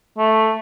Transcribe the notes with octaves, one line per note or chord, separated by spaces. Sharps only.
A3